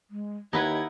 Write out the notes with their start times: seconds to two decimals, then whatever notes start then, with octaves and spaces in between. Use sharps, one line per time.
0.10 G#3
0.53 D#2 D#4 E4 B4 D#5 F#5 G#6